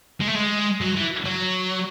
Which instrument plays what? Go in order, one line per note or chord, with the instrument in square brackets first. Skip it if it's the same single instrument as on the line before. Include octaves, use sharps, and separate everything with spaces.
[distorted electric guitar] G#3
A3
G#3
F#3
E3
F#3